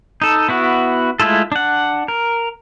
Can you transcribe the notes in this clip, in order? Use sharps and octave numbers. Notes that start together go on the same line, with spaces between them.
D#4 A4
B3 E4 F#4
G#3 A3 E4 F4 A4
D4 F#5
A#4